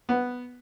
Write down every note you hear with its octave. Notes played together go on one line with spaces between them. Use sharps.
B3